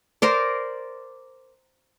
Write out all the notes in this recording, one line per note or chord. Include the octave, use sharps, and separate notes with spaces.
A#4 C5 D5